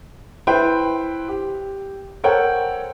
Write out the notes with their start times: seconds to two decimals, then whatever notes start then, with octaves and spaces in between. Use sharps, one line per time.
0.47 E4 B4 C5 E5 G5 C6
1.28 G4
2.24 A4 A#4 C5 C#5 F#5 G5